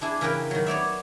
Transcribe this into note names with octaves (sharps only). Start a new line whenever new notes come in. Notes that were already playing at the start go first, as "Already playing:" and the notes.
D4 E4 G#4 A5
C#3 E3 E4 A#4 B4 G5
D#3 F#3
B3 C#5 D5 E5